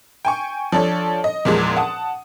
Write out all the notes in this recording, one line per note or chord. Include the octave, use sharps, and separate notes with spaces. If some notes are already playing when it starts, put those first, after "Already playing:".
G5 G#5 C#6
F3 D4 A4 C#5
D#5
E2 A#2 F3 G#3
F#5 A5 D#6